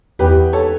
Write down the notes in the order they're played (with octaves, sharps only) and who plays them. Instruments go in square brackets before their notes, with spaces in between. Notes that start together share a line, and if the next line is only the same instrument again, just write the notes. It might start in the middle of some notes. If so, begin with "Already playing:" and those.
[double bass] E2 [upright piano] G4 B4
[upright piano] A4 C#5